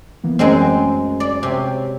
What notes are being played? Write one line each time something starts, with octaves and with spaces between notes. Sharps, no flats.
E3 A#3 B3
F#2 G#3 A3 C4
D5
C3 C#5 G5